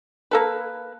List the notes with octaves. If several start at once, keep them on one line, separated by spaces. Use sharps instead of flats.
A#3 A4 B4